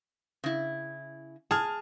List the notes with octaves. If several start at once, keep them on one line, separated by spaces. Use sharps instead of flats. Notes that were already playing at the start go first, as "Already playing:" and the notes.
C#3 E4
G#4 A5 F6